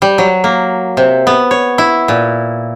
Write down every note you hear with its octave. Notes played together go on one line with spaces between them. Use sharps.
G3
F#3
A#3
C3
B3
C#5
E4
A#2